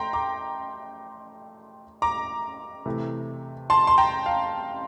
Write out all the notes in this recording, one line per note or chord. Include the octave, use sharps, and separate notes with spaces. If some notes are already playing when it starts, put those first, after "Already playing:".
Already playing: A3 G5 A#5 C6
A#5 D6
A#5 D6
C3 E3 A3
A5 C6
C6
G5 A#5
F5